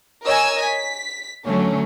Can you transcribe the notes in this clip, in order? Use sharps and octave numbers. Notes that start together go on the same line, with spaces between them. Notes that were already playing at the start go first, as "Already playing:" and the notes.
A#4 C#5 D#5 G#5 E6
B6
D3 F#3 A3 C#4